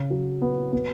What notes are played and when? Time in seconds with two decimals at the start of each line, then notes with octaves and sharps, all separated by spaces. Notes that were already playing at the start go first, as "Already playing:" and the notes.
Already playing: C#3
0.10 F#3
0.42 B3
0.73 B3